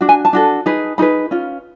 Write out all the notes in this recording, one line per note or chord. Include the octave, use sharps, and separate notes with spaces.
D4 F#4
G#5
A5
D4 F#4 A4
D#4 G#4 B4
D#4 G#4 B4 B5
C#4 F4